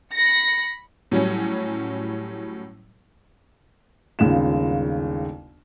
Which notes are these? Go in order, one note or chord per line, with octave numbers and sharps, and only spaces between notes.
B5 A#6 C#7
A2 F#3 G3 C#4
G1 D#2 C#3 G#3 F4 E7